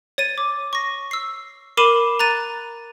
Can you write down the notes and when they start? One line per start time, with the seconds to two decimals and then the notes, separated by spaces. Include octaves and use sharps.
0.18 C#5 A6 D#7
0.38 D6
0.73 C#6 A#6
1.11 E6 C7
1.77 A#4 B5 D6 C7 D#7 E7
2.19 A#5 F#6 A6 D#7